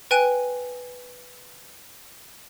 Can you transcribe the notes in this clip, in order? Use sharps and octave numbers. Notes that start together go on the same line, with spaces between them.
B4 G5 G#5 F#6 D7 D#7